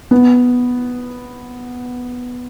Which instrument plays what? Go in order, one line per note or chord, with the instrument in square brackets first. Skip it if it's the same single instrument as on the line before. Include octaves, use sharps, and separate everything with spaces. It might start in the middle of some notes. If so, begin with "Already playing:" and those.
[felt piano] B3